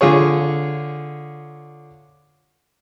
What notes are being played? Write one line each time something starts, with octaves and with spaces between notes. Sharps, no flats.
D3 F4 G#4 C#5